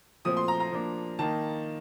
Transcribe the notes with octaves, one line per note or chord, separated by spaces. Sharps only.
A#2 F3 A3 C4 D#6
C6
A#5
A#5
F3 A#3 D4
D#3 A#3 D#4 A5